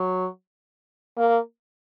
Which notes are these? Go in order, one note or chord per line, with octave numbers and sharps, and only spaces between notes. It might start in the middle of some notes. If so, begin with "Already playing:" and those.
Already playing: F#3
A#3